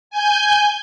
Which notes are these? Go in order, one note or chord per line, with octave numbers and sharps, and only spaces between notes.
G#5 G6